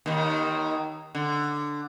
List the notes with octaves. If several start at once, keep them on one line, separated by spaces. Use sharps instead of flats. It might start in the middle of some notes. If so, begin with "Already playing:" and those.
D#2 D#3
D3